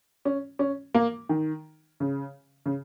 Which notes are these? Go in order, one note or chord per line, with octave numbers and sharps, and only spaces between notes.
C#4
C#4
A#3
D#3
C#3
C#3